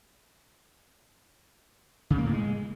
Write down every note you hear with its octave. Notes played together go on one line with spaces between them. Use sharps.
C#3
A#3
A2
G#3